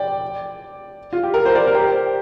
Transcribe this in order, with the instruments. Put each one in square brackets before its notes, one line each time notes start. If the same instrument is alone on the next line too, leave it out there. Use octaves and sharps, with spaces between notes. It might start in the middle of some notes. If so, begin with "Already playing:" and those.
Already playing: [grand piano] D5 G5
F4
G4
A#4
C5
A#4 D5
A#4
G4 C5